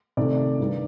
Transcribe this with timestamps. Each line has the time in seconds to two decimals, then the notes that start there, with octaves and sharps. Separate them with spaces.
0.17 C3 D#3 A3 D5
0.59 G2 D#3 G3